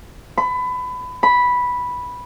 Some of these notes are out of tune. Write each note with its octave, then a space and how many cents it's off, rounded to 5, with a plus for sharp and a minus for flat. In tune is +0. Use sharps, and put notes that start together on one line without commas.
B5 +25
B5 -5